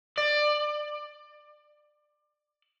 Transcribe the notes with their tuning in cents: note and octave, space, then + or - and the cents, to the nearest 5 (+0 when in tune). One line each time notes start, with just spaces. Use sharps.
D5 +20